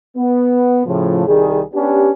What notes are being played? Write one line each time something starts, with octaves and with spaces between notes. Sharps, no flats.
B3
A2 C#3 F3
C2 D#3 G3 G#4
B3 C#4 D4 G4